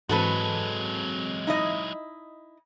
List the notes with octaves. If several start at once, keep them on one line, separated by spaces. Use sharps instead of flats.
G#2 E3 F#3 G#3 C4 F#4 A4 B4
D#4 E4 D#5